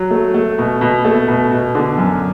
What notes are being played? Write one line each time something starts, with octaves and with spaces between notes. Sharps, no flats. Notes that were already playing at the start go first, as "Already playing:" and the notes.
Already playing: F#3
A3
A3
B2
B2
A3
B2
B2
D3
F#2